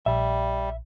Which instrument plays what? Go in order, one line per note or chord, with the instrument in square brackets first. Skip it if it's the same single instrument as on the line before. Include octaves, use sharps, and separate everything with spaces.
[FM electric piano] A#1 [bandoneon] G3 [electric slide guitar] E5